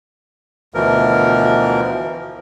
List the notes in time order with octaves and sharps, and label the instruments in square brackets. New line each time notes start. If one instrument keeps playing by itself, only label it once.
[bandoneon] D2 B2 E3 F3 A#4